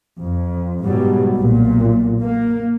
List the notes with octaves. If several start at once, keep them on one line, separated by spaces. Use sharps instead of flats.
F2
G#2 B2 F#3 G3
B1 A#2
A#3